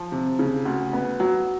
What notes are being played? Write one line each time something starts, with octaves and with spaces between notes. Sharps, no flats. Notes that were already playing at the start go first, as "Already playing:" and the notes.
Already playing: F3
C3
C#3
D2
B3
F#3